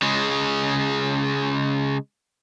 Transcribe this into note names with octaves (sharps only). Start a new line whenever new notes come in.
C#3 G#3